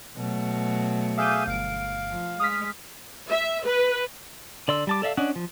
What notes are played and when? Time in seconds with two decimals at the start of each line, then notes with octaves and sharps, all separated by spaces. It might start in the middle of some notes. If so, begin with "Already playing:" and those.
0.15 B2 F#3 A3
1.18 G#4 E5 F5 D6 G6 D#7
1.47 G1 F5 D7
2.09 F3
2.40 G#3 D#6 F6 B6
3.30 E5
3.66 B4
4.68 D3 D5 C6 E6
4.87 G3 A5 D6
5.02 A4 D5 E5 F5
5.17 C#4 D4 D#5 F#5
5.36 F3